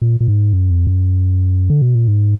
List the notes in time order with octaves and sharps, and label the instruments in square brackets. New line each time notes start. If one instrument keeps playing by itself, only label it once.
[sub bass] A#2
A#2
G#2
F#2
F2
F#2
D3
B2
A#2
G#2